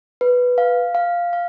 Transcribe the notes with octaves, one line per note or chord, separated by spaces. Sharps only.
B4
F5
F5
F5